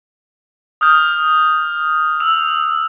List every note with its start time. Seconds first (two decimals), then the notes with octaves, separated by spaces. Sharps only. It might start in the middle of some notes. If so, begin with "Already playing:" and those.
0.81 D#6 F6 G6
2.20 E6 F7